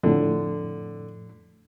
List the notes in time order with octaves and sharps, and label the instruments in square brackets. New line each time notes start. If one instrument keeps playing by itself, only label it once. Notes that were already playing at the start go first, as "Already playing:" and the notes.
[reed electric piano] F2 A2 [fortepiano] D3